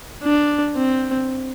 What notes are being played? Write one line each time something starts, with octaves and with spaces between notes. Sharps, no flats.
D4
C4